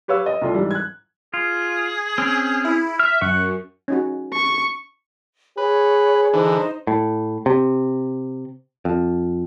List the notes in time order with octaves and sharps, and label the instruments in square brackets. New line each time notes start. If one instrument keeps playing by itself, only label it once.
[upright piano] G4 B4 C#5 F5 E6
D#5
C2 A3 F4 D5
G#2 E3 G3
F#6 G#6
[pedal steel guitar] F4 [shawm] G#4
[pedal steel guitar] C4 C#4
[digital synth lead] E4
[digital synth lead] E5 [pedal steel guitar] F6
[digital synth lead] F#2 [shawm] F#5 [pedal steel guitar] C#6
[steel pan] C#4 D#4 F#4
[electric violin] C#6
[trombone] G#4 [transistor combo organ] B4 [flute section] C#5
[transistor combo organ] D3 E3 [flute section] D#4 C5
[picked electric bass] A2
C3
F2